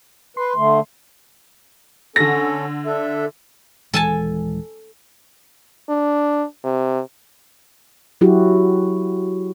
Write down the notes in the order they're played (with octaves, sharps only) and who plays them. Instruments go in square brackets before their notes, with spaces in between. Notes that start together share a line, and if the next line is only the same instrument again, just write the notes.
[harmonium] B4 [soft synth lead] C6
[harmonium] D3 A3
[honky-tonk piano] D3 A#6 [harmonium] C#4 A4
[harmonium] D4 A4 E5
[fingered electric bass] D#1 E3 G#3 [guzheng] A4 G#5 A5
[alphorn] D4
C3
[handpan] F#3 E4 F#4 G4